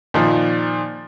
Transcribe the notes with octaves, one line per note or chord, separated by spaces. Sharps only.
A#2 D#3 F3